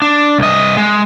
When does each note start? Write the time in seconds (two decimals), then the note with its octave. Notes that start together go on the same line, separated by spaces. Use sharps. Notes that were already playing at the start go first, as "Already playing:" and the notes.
0.02 D4
0.38 C2 D#5
0.77 G#3